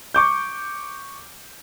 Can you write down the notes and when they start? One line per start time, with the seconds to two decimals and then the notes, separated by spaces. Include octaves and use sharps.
0.14 C#6 D6 G6